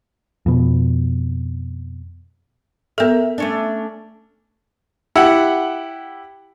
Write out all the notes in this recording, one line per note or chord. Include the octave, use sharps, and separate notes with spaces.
F2 B2
B3 A4 A#4 E5
A3 C#4 D4
E4 G4 F#5 E6